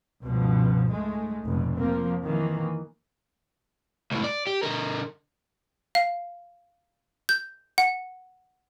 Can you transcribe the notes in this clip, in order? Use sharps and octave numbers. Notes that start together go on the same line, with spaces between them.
C#2 G2 B2 F3
G#2 G#3 A3
F1 G#2 B2
F3 A#3 C4
D#3 E3 A#3
C#2 A2
D5
G4
D3 A#4
F5
G6
F#5